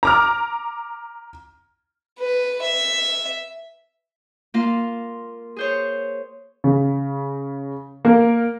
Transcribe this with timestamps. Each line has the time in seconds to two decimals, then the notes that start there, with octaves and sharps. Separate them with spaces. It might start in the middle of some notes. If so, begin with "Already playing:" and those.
0.03 A#5 D6 F6
2.19 B4
2.62 E5
4.54 A#3 F4 F5
5.56 G#4 C5 C#5
6.64 C#3
8.05 A#3 A#4